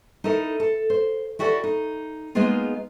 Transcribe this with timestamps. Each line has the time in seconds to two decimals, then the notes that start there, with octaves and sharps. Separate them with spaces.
0.24 D#4 E4 A4 A#4
0.60 A4
0.90 C5
1.39 E4 F#4 G4 A4 D5
1.64 D#4
2.35 G#3 A#3 B3 D#4 F4 G#4